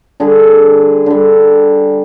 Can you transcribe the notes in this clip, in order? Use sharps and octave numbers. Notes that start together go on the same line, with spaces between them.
D3 G3 G#4
D3 G3